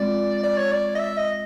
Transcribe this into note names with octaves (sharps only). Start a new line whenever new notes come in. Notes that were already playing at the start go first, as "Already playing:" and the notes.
Already playing: G#3 C4 F4 D5
D5
C#5
D5
D#5
E5
D#5